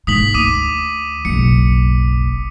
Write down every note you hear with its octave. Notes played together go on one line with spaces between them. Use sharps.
G#2 A#3 D#6 B6 F#7
D2 D6 D#6 D#7
F#1 B1 C#7